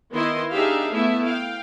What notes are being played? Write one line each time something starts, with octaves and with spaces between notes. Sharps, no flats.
D#3 B3 E4 D#5 C6
D4 D#4 G4 G#4 E5 F5
A3 B3 E4 E5
F5 G5